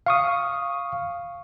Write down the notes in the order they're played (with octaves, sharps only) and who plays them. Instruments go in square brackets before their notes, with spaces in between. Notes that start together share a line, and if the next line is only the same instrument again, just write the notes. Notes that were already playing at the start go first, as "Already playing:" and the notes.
[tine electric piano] F5 C#6 D#6